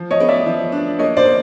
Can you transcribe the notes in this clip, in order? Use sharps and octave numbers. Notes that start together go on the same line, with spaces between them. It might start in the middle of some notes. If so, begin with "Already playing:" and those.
Already playing: F3
C#5 D#5
B3
D5 E5
F3
D4
A#3 C#5 D#5
C5 D5
A#3